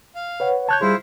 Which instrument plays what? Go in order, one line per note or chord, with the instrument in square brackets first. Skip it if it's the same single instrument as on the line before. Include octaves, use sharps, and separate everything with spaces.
[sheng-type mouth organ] F5
[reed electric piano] B4 C#5 F#5
[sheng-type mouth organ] C#5 [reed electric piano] A5 F#6 G6
[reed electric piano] G3 G#4 [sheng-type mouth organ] E4 F4 C5